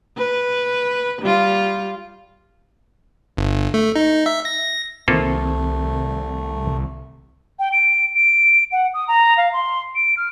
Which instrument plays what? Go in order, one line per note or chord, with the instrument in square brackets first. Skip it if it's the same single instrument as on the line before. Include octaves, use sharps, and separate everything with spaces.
[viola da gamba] B4
G3 F4
[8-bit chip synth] G1
A3
D#4
E5
A#6
[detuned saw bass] C2 [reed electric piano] D#3 C4 [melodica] A3 [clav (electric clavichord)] A#3 F4 A4
[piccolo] G5
D7
D7
F#5
D#6
A#5
F5
C6
D7
F6